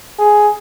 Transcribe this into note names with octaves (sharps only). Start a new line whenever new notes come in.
G#4